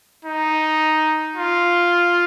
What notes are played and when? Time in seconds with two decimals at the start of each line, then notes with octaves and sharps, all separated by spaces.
0.25 D#4
1.36 F4